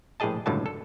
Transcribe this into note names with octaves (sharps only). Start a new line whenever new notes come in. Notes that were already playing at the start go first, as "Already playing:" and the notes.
A#1 A2 G4 G#4 D#5 A5
G1 C#2 A2 D3 F#3 A5
A4